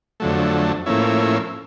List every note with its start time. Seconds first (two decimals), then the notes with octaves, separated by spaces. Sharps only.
0.20 F2 D3 F#3 A3
0.86 A2 F3 A#3 C#4 E4